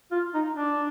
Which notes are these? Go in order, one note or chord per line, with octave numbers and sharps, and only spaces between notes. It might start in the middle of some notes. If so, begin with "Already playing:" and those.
F4
D#4
D4